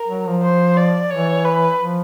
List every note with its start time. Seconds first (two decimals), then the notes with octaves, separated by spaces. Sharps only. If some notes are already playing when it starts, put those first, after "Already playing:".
Already playing: A#4
0.08 F#3
0.26 F3
0.43 C5
0.77 D5
1.11 E3 C#5
1.45 B4
1.78 F3